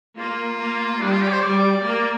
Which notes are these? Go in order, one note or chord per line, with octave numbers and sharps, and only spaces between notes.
A#3 F4
A#3
G3 D4
F4
G4
D5
C5
G3 D5
A#3